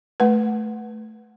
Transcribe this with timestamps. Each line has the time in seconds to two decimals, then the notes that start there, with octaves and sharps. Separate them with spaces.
0.20 A3 B4